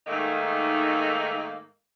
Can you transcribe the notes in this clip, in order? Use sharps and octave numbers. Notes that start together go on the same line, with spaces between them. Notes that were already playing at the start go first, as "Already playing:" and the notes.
G#2 D#3 A3 A#3 D#4